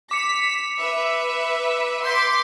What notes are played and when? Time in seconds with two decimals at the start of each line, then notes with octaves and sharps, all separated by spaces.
0.11 D6 B6 C#7 F7
0.80 B4 E5
2.05 C6 D6 G6 B6